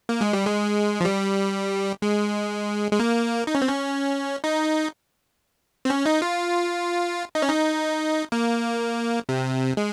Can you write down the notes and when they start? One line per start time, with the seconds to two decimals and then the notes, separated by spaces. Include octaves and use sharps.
0.09 A#3
0.21 G#3
0.33 G3
0.46 G#3
1.01 F3
1.05 G3
2.02 G#3
2.91 G#3
2.99 A#3
3.47 D#4
3.55 C#4
3.62 C4
3.68 C#4
4.44 D#4
5.85 C4
5.90 C#4
6.06 D#4
6.22 F4
7.35 D#4
7.42 C#4
7.49 D#4
8.32 A#3
9.29 C3
9.77 G#3